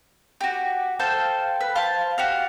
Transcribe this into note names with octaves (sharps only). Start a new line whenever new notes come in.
F#4 G4
A4 C5 F5 G5
B4
C5 F5 A5
F#4 G4 F5